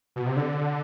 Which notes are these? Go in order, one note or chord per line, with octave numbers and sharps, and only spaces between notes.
B2
C3
D3